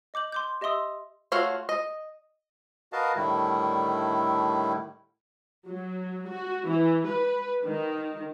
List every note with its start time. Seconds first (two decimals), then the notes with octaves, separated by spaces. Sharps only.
0.14 D#5 D6 G6 F#7
0.32 C6 D6 G6
0.61 G4 D#5 E5 C6 D#6 E6
1.32 A3 F4 F#4 C#5 F5
1.69 D#5
2.93 F#4 A#4 B4 D#5 F5 A5
3.16 A2 D3 D#3 G3 A3 E4
5.67 F#3
6.29 F#4
6.68 E3
7.07 B4
7.65 D#3